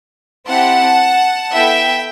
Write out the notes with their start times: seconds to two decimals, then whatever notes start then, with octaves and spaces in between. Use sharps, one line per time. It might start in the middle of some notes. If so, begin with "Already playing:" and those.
0.48 C4 E4 G4 F#5 A5
1.52 B3 E4 A4 E5 G5